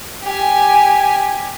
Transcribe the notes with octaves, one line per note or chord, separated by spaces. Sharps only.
G4 G#5